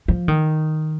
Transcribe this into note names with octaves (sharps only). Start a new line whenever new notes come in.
F3
D#3